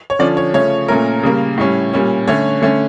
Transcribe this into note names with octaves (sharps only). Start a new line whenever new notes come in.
C#5
D3 F3 C#4 D5
C#5
C#3 F3 A3 C#4 C#5
A#2 A3 C#4 A#4
C#3 G3 A#3
A2 G3 C#4
A#2 G3 C#4
D3 A3 C#4 C#5
D3 A3 C#4